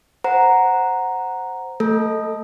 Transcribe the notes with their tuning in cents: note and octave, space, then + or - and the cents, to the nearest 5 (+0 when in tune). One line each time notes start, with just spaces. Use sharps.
C5 +0 F#5 +0 A#5 +0
A3 +25 A4 +0